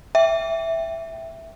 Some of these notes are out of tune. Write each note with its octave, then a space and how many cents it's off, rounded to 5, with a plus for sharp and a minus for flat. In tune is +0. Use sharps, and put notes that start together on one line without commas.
E5 +0 G5 +0